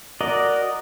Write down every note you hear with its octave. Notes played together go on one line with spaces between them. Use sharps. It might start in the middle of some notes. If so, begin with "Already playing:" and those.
F#4 A#4 D5 D#5